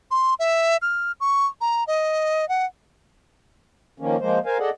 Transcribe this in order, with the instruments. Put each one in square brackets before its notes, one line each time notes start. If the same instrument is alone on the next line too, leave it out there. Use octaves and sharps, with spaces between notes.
[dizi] C6
E5
F6
C#6
A#5
D#5
F#5
[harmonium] D#3 F3 A#3 C#4
F3 G#3 A#3 C5
A#4 C5 F5 G#5
G#4 A4 D5 D#5 F#5